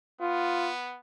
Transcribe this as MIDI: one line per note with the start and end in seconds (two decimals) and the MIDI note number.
0.21 0.98 59
0.21 0.71 65